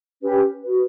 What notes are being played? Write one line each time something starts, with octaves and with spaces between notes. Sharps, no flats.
C#4 G4 B4
F#4 B4